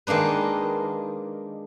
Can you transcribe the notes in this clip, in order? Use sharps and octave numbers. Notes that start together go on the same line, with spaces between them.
D#3 G#3 A#3 D4 B4